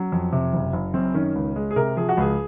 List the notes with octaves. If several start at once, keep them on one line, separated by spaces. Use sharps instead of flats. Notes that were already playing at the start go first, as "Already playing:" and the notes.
Already playing: F#3 C#4
F2
C3
F#1
F#1
F#2 C4
D#3 C#4
C#2
G#3
G#4
C3 A#4
F3 G#4
F#4
C#2 G#4